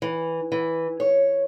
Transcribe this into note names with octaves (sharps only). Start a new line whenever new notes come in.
E3
E3
C#5